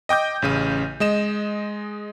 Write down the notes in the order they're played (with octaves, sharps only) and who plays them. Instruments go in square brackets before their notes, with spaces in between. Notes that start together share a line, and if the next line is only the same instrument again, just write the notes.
[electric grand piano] D#5 G5 D6 G6
A1 C#3 D#7
G#3 D#5 E7